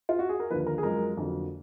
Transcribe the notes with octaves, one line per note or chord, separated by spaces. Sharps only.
F4
F#4
G#4
A#4
D#2 D3 F3 A#3 B4
A#4
G#4
F#2 F3 G#3 A#4
F2 D3 F#3 A#3